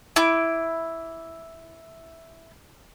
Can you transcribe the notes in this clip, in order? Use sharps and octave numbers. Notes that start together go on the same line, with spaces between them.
E4 D6